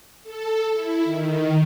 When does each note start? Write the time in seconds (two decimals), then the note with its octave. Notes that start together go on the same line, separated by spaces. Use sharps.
0.24 A4
0.73 E4
1.05 D#3